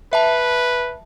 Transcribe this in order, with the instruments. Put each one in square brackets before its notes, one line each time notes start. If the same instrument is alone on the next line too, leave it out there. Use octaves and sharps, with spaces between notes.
[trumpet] B4 [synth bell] E5 A5